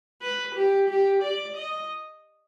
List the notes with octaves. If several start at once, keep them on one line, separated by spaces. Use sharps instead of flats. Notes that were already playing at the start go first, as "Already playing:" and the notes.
B4
G4
G4
D5
D#5